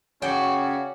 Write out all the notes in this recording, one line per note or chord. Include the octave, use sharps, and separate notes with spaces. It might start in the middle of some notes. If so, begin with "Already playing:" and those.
C#3 C#4 F#4 D5 G5